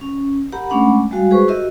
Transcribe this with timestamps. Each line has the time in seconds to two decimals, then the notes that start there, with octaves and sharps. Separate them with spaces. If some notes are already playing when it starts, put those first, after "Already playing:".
0.01 C#4
0.52 G4 A#4 F#5 A#5 B5
0.70 G#3 A3 C#4 D4 F#5 B5
1.11 G3 G#3 F#4 F5
1.31 F#4 G#4 B4 C5 C#6
1.48 E4 F#4 G4 A#4 D#5 E5